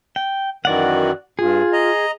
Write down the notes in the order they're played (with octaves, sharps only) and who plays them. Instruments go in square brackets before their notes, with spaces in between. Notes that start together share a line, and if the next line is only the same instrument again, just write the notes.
[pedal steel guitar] G5
[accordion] F#2 D#3 E3 [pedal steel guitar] F#4 D5 F#5
[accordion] G2 [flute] F4 [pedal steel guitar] G#4
[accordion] D#5 A#5